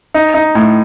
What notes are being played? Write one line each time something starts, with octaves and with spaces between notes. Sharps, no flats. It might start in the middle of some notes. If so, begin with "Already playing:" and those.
D#4
D#4
A2